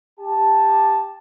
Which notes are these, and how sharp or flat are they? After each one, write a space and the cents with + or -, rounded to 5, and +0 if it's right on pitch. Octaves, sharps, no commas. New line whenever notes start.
G4 +15 A5 +0